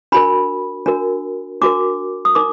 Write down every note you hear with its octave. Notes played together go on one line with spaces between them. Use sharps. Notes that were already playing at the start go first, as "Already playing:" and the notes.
D4 F#4 A#4 B5
D4 F#4 A#4
D4 F#4 A#4 D6
D#6
D#4 A#4 D6